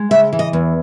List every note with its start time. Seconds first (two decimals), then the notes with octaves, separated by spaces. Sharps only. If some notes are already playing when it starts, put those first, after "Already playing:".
Already playing: G#3
0.11 C#3 E5
0.33 E3
0.39 D#5
0.53 E2